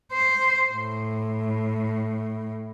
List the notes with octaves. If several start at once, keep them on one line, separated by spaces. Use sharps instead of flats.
C5
A2